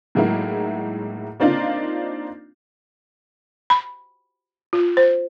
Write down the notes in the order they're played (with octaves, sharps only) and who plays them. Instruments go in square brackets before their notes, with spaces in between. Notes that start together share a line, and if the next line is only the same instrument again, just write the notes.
[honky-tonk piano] A2 F#3 G#3 A#3 D#4 E4
A#3 C4 D4 D#4 F4
[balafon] B5
F4
C5